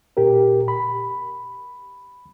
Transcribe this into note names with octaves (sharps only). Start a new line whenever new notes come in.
A#2 G4 A#4
B5